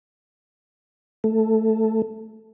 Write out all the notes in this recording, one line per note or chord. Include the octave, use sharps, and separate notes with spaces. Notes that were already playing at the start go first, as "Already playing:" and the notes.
A3